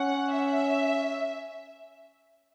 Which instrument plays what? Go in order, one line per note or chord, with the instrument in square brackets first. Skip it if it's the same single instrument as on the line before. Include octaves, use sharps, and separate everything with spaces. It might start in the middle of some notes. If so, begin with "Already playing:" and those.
Already playing: [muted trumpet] C#4 [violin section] F#5
[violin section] E5